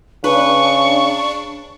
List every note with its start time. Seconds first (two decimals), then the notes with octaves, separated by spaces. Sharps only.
0.24 C#3 D4 B4 C#6